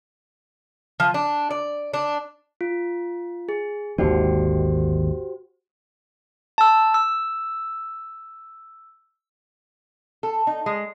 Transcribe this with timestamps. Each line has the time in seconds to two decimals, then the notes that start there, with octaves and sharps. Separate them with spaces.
1.00 F3
1.14 D4
1.51 D5
1.94 D4
2.61 F4
3.49 G#4
3.98 G#1 D#2 D3 F#4 G4 C5
6.58 A5 E6
6.94 E6
10.23 A4
10.47 D#4
10.66 G#3